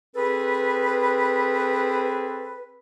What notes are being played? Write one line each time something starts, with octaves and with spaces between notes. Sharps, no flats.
C4 G#4 A4 B4